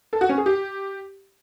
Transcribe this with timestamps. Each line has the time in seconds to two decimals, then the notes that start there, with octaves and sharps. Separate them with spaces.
0.13 A4
0.21 F#4
0.29 C#4
0.38 G#4
0.46 G4